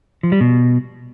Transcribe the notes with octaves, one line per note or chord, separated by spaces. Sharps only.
F3
G3
B2